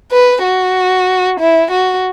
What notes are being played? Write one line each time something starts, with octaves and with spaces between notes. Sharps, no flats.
B4
F#4
E4
F#4